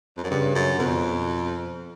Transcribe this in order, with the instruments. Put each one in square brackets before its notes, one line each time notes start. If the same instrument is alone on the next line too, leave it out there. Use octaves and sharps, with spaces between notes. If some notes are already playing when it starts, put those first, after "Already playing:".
[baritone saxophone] F2
F#2
[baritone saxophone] G2 [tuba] C#3
[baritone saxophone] F#2
[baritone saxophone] F2 [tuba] B2